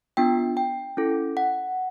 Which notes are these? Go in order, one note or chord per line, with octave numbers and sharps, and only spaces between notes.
B3 D4 F4 G5
G5
C#4 E4 A4
F#5